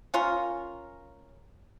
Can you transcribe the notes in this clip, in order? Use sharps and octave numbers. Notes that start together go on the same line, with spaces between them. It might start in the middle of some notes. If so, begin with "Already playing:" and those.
C#4 F4 A#4